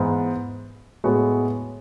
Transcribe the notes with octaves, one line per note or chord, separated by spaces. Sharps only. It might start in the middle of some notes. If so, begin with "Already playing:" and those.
Already playing: G#2 E3 B3
A2 G#3 B3 F#4